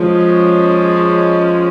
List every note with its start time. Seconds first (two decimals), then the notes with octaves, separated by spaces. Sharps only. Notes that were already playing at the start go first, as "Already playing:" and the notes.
Already playing: F3 G#3 C#4